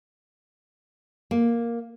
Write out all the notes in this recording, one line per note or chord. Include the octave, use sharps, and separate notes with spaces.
A#3